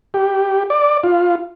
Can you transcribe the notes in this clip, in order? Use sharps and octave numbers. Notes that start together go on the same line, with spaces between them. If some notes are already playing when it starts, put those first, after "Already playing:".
G4
D5
F4